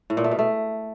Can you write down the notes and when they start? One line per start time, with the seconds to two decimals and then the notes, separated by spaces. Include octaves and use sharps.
0.10 A2
0.17 A#2
0.24 A3
0.31 B2
0.39 A3